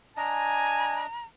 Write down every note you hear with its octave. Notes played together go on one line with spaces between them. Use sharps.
D4 D#5 G#5 A#5